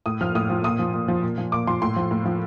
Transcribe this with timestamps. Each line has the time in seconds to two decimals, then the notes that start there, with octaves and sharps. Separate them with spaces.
0.06 A2 D#6
0.21 F3 F6
0.35 A2 D#6
0.50 F3
0.64 A#2 D#6
0.79 F3
0.94 A#2
1.08 F3
1.23 A#2
1.38 F3
1.52 A#2 D6
1.67 F3 C6
1.82 A2 C6
1.96 F3
2.11 A2
2.25 F3